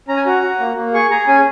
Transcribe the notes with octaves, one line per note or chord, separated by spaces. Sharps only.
C#4 A#5
G#5
F#4 A#5
F#4
A#3
A#3
G#4 C#6
G#4 A#5
C#4 G#5